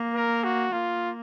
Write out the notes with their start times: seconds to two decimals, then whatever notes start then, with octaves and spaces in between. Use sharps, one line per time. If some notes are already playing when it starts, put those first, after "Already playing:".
Already playing: A#3
0.15 A#4
0.44 F#4
0.73 A#3 F4